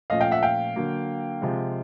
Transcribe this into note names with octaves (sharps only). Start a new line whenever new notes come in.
A#2 F3 A3 C#4 D#5 F5
F5 G5
E5 F#5
F5 G5
D3 F#3 A#3
C3 F3 G#3